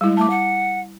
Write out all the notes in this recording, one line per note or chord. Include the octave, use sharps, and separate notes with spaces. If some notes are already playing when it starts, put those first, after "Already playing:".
G3 G#3 E4
A3 A5 D6
F#5